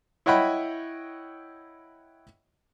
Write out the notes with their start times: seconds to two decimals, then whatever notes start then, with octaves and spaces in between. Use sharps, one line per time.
0.26 E4 C#5 D#5 F#5 G5 B5